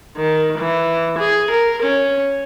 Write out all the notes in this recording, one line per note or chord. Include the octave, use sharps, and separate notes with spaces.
D#3
E3
G#4
A#4
C#4